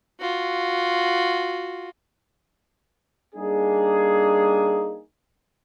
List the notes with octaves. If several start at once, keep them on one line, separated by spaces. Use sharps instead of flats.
F4 F#4
G3 A#3 D4 D#4 G#4